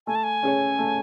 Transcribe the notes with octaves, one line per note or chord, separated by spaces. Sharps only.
A3 G#5
A5
G#5
C#4 G#4 C#5
A3